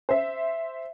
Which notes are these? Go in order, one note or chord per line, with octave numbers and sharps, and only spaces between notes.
C5 E5